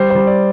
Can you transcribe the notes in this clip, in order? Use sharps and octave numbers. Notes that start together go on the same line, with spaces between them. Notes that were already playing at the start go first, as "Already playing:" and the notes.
Already playing: G3 C5
C5
G3
D5